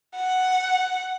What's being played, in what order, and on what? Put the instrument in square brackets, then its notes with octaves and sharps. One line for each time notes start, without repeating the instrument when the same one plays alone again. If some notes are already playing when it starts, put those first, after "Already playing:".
[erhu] F#5